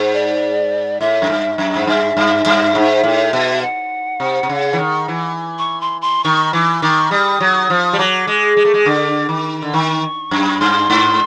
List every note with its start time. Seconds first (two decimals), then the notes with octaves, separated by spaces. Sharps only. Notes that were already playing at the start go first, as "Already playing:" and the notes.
Already playing: G#2
0.14 D5
1.00 A2 E5
1.22 F#2
1.30 G2
1.58 F#2
1.75 G#2
1.87 G2 E5
2.17 G2
2.46 G2
2.75 G#2
3.04 A2
3.33 B2
3.62 F#5
4.20 C3
4.43 C3
4.49 C#3
4.73 E3
4.79 D#3
5.08 E3
5.59 C#6
5.81 C6
6.02 C6
6.24 D#3 C#6
6.53 E3 D6
6.82 D#3 D6
7.11 G3 D#6
7.40 F#3
7.70 F3
7.93 G3
7.98 F#3 D6
8.27 G#3
8.57 G#3
8.65 A3
8.74 G#3
8.85 D3 D6
9.29 D#3
9.62 D3
9.73 D#3 C#6
10.31 F#2
10.54 B5
10.60 G2 C6
10.90 G#2